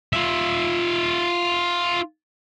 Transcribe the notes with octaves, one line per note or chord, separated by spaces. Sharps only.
F4 E5